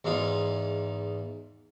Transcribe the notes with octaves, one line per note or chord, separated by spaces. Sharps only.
E2 G#2 D#4 F4